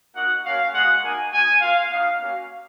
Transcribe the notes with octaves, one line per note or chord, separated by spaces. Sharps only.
A#3 D#4 F#4 F#5
A#3 C#4 F#4 F5
G#3 B3 F#4 F#5
A#3 D#4 F#4 G#5
G#3 D#4 F#4 G#5
A#3 F4 F5
B3 D#4 F#4 F5
A#3 C#4 F#4